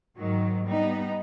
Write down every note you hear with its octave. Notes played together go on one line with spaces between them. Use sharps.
G#2 D#3 F#3
G3 B3 D#4